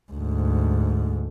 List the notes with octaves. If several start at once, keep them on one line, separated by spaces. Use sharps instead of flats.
D2 G#2